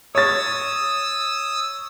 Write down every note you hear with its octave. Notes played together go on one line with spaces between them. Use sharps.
C#5 D#6 E6 A6